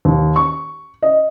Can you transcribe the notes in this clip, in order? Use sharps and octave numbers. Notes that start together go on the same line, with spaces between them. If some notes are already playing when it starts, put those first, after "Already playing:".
D#2
C#6
D#5